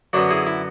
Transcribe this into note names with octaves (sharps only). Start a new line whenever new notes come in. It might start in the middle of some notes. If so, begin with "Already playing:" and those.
F#2 D3 F#3 B3 D4 F#4
E4 G#4
E4